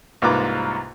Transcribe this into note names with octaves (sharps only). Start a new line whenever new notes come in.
C2 G#2 A#3 F4 B4 D6